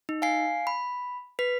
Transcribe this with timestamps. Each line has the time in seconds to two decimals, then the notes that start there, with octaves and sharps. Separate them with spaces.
0.09 D#4
0.22 F5 G#5 C7
0.67 B5
1.39 B4 B6